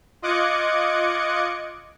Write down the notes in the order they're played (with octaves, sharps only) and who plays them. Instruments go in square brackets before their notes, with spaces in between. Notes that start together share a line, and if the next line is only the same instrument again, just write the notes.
[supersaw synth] F4 D#5 D6 F#6 G#6 C#7